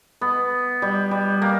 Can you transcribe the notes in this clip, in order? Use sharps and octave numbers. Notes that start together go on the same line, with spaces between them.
B3
G3
G3
A#3